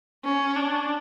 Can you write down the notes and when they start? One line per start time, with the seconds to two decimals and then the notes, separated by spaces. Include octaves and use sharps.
0.25 C#4
0.56 D4